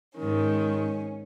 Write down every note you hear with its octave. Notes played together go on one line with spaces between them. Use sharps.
G#2 D#3 C#4